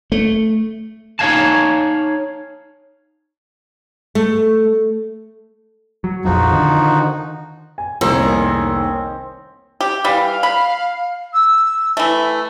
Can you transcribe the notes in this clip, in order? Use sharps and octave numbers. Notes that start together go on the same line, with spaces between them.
A3
D#4 C#5 D#5 F5 G#5 A5
A3
F#3
A#1 F2 F3 D#4 F#4
D3 D#3
G#5
F1 C2 D#3 A#3 C4 C#4 G#4
G4
E3 G3 F5
B5
E6
E3 A3 E5